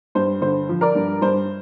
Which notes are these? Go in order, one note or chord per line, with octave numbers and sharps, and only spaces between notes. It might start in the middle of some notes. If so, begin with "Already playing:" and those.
G2 C5
D3 C5
F3
A#4 D5
G2
G2 C5